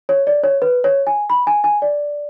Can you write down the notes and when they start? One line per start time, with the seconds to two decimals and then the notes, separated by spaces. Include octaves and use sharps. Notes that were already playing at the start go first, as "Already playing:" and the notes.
0.09 C#5
0.27 D5
0.43 C#5
0.62 B4
0.84 C#5
1.07 G#5
1.30 B5
1.47 G#5
1.64 G#5
1.82 D5